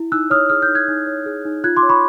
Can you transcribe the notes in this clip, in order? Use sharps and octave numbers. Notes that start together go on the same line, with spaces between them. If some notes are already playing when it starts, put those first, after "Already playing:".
Already playing: E4
D#4 E6 F#6
C#5 D#6 F6
G#4 D#6 F6
F6 G6
D#4
F#6 G#6
D#4
C#5
G#4
D#4
F4 F#6 G#6
C6 D6
C#5
B5 C#6